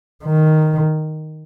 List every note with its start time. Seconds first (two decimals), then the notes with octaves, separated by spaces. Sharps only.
0.24 D#3